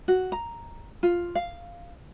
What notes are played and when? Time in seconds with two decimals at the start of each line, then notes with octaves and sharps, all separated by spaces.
0.08 F#4
0.32 A#5
1.03 F4
1.35 F5